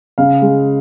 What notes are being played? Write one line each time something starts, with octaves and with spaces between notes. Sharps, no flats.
C#3 F5
G#3